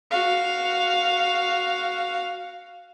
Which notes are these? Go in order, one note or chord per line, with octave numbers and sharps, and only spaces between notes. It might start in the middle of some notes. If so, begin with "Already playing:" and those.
F#4 F5